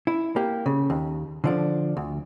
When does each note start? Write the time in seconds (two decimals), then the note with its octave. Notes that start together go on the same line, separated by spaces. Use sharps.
0.07 E4
0.36 A#3 G4
0.66 C#3
0.90 D#2
1.44 D3 F3 D4
1.97 D2